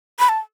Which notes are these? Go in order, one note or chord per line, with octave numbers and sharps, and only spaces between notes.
B5
A5